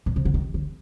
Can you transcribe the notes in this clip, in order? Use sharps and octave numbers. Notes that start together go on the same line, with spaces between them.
A#2
C3
D3
D#3
D3